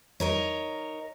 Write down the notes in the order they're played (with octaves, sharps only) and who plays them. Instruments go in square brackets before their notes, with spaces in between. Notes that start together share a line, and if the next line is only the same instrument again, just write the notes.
[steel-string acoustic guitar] D#4 A#4 C#5